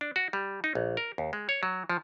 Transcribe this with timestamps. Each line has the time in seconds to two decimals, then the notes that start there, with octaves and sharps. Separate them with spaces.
0.01 D4
0.16 F#4
0.33 G3
0.64 D#4
0.75 A#1
0.97 A#4
1.18 D#2
1.33 G#3
1.49 C#5
1.63 F#3
1.90 F3